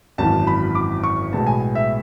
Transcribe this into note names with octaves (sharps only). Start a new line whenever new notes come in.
G#1 F#2 E3 A5
B5
D6
C#6
B1 A2 G#3 B3 A5
G#5
E5